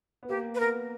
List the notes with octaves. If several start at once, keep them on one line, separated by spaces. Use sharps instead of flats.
B3
A#3 G4
B4
B3 A#4